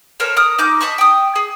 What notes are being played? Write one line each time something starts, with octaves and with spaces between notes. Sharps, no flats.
A4 A#4 C5 C#5
A#4 D#6
D#4 D6 G6
D#5 A5 B5 C#6
G5 D#6
G#4